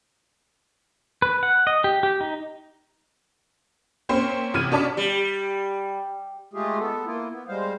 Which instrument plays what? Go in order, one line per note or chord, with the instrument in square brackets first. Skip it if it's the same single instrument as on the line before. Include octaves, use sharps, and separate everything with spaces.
[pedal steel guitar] B4
F#5
D#5
G4
G4
D#4
[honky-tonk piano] A#3 C4 C#4 C5
A1 C3 F6 G#6 D#7
B2 C#4 D4 A5 D6 B6
[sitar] G3
[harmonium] G#3 A3 F4 G4 G#4
B3 A4
A#3 E4 F4
B3
G3 G#3 C5 F5